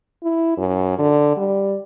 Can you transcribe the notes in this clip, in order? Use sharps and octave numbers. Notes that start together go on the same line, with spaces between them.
E4
F#2
D3
G3